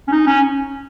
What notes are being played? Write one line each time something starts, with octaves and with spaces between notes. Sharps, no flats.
C#4
D#4
C#4